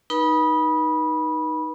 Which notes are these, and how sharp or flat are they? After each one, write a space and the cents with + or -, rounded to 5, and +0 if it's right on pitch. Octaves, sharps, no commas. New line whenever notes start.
D#4 +0 B4 -35 B5 -20